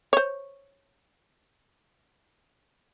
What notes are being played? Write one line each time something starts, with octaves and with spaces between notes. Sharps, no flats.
C5 C#5